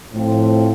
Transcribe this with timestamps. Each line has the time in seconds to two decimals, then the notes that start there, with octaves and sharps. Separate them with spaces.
0.12 A2 F3 C4